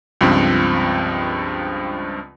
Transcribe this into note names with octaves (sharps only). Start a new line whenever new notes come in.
C#2 G2 F3 C4